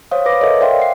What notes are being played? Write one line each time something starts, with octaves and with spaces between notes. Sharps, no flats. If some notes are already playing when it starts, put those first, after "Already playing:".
C5 C#5 F5 D#6
B4 D6 A#6
A4 A#4 C#5 D#5 E5
C5 D5 E5 F5 G5 C6
F#5 C7